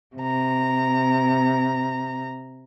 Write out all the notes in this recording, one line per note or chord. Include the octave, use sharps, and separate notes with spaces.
C3 A#5